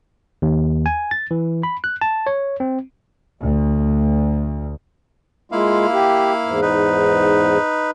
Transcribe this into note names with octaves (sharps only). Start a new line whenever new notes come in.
D#2
G#5
A6
E3
B5
F#6
A5
C#5
C4
D2
G#3 A#3 E4 F4 F5
G4
E2 G#2
D#4 B4